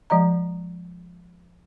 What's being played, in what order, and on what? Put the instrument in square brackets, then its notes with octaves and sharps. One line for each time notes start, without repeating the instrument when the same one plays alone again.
[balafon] F3 G#3 D#5 A#5